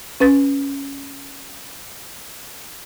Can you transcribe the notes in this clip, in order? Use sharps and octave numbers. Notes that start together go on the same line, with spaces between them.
C#4 B4 A6